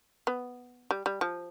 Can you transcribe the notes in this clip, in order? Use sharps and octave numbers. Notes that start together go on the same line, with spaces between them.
B3
G3
G3
F3